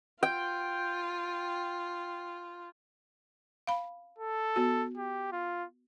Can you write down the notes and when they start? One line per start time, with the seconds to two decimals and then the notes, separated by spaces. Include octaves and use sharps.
0.23 F4 G5
3.67 F5 B5
4.19 A4
4.56 B3 F#4
4.97 G4
5.32 F4